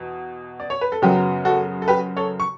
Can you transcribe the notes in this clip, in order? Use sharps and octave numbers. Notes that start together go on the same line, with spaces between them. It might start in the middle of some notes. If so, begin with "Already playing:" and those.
Already playing: E2 B2
D5
C#5
B4
A4
F#2 C#3 F#3 B3 G4
F#4 A4
A4
G4 B4
A4 C#5
C#6